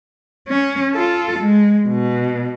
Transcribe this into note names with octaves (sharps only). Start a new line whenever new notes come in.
C#4
F4 A4
G#3
B2